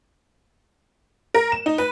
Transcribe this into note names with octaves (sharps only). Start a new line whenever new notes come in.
A#4
E7
D#4
B4